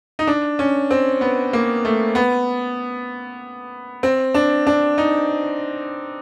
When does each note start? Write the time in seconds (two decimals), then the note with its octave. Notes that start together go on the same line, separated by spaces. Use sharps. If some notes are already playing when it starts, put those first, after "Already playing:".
0.19 D#4
0.27 D4
0.59 C#4
0.91 C4
1.21 B3
1.53 A#3
1.85 A3
2.15 B3
4.03 C4
4.34 D4
4.67 D4
4.98 D#4